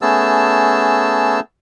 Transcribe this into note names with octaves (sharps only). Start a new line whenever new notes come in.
A3 B3 C#4 G#4 A5 E6